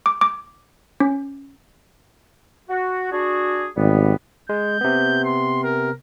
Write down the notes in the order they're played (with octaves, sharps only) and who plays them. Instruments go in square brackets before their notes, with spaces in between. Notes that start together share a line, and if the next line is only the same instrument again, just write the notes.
[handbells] D6
D6
C#4
[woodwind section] F#4
D4 F#4 G#4
[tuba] G#1 [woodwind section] G3 B3
[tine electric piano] G#3 [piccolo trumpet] G6
[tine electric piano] C3 B3
[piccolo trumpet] C6
A#4